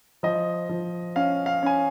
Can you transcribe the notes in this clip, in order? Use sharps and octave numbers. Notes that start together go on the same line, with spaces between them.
F3 D#5
F3
C#4 F5
F5
C#4 G#5